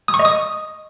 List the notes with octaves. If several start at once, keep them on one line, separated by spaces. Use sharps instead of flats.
D#6
C#6
D#5
D#6